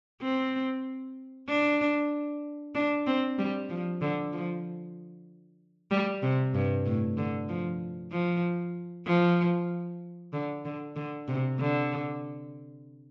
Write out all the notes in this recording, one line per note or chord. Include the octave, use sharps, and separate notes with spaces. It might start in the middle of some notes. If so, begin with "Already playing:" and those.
C4
D4
D4
C4
G3
F3
D3
F3
G3
C3
G2
A2
D3
F3
F3
F3
D3
D3
D3
C3
D3